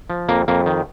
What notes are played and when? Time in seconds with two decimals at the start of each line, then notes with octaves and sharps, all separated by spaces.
0.10 F3
0.29 F2 A#3
0.48 F2 A#3
0.66 D#3